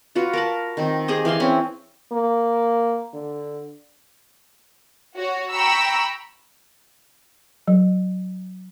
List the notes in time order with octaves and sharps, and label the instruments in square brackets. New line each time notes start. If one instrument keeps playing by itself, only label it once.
[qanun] F4 F#4 B4
A#4 A5 B5
D#3 C4
G4 G#4 C5 D#5
E3 F5 G#5 C6
C4 C#4 E4
[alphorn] A#3
D3
[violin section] F#4 C#5
G5 A#5 B5 C#6 E6
[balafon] F#3